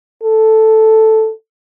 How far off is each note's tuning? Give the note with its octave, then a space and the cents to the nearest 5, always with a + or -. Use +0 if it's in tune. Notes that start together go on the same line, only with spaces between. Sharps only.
A4 +0